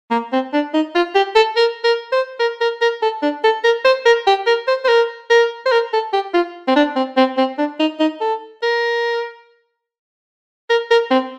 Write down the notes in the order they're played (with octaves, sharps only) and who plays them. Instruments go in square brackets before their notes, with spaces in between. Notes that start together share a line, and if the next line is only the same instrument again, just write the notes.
[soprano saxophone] A#3
C4
D4
D#4
F4
G4
A4
A#4
A#4
C5
A#4
A#4
A#4
A4
D4
A4
A#4
C5
A#4
G4
A#4
C5
C5
A#4
A#4
C5
A#4
A4
G4
F4
C4
D4
C4
C4
C4
D4
D#4
D#4
A4
A#4
A#4
A#4
C4